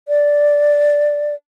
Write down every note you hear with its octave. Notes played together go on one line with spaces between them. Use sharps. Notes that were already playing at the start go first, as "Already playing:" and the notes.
D5